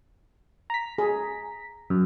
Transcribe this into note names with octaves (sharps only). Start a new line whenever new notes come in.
A#5 B6
G#4
F#2